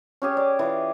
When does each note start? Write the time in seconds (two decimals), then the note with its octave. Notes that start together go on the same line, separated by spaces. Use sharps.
0.22 C#4 G4 G#4
0.37 D5
0.59 E3 F4